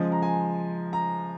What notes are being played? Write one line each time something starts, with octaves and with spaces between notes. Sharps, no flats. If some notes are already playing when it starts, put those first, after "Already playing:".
Already playing: C#3 F3 G#3
A#5
G#5
A#5